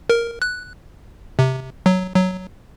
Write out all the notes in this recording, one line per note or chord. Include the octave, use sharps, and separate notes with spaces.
A#4
F#6
C3
F#3
F#3